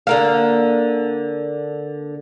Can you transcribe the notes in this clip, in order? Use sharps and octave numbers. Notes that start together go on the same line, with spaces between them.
D3 A#3 F5